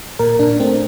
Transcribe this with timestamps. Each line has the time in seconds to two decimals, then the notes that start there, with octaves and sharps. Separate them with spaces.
0.19 A#2 A#4
0.39 A#2 D4
0.60 A3 C4